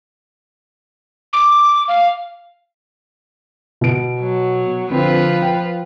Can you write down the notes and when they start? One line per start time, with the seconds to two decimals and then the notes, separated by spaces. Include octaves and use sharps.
1.33 D6
1.88 F5
3.81 B2 D7
4.20 F#3
4.90 D3 F3 C4 F4 B4
5.42 G5